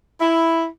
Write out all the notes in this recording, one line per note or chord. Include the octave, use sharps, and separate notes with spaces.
E4